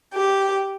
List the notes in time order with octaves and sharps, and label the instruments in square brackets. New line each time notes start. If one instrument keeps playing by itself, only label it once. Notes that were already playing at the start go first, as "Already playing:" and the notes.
[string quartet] G4